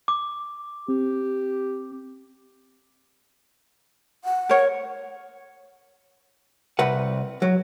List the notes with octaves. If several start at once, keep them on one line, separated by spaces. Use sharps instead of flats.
D6
C4 G4
F#5
A#4 C#5
C2 B4 F#5
F#3